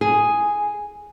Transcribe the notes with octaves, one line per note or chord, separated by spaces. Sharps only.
G#4